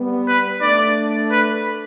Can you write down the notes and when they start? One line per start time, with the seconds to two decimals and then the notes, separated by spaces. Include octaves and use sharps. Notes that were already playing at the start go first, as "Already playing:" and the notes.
Already playing: G3 B3
0.28 B4
0.61 A3 D4 D5
1.31 B4